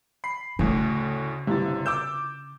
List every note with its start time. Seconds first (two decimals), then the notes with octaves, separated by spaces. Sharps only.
0.24 B5 C7
0.59 D2 A2 C#3
1.47 G1 C3 E4 A6
1.86 D6 E6 G6 E7